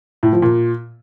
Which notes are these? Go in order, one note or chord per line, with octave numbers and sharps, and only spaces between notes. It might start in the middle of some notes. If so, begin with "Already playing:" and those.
A2
F3
A#2